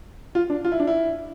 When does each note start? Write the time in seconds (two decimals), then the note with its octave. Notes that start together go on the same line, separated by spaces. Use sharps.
0.35 F4
0.50 D4
0.65 F4
0.72 E4
0.80 D4
0.87 E4